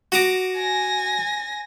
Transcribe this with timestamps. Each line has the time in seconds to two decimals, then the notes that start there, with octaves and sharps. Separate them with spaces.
0.12 F#4 A#5 D6
0.58 G#5 A#6